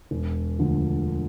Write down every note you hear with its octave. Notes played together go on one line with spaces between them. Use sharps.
E1
D2 D3 F3